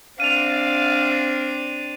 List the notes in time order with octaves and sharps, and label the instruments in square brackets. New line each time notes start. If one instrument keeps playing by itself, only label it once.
[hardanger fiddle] C4 D4 [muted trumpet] F5 [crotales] D#7 F7